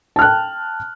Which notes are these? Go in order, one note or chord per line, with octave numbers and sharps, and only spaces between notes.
G5 A5 F6 F#6